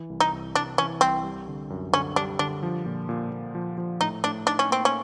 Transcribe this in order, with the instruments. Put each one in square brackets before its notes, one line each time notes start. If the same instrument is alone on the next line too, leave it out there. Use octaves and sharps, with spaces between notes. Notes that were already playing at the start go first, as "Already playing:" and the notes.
Already playing: [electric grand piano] E3
C2
[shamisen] D#4
[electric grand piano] C2
[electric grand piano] C2 [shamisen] D4
[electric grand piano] E3 [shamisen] C#4
[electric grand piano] C2 [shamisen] C4
[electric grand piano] G3
D3
F#2
[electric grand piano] D3 [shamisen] C#4
[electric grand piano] G3 [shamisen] D4
[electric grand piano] D3 [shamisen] D4
[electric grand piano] F3
A#2
A#2
A#2
F3
F3
[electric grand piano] A2 [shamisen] D#4
[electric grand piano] A2 [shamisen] D4
[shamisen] D4 [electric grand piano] D#4
[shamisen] C#4
[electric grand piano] A#3 [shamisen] C4
[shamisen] C#4